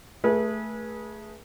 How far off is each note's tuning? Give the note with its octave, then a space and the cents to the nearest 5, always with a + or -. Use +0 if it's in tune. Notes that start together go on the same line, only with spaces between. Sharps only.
A3 +0 G#4 +0 B4 -35